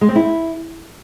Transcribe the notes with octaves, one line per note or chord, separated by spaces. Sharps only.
G#3
C4
E4